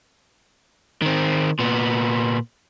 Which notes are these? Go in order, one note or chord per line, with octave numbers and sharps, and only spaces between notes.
D#3 C4
A#2 B3